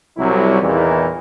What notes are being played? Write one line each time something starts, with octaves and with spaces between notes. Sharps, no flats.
C2 F#3 E4
E2 A#2 D#3 E3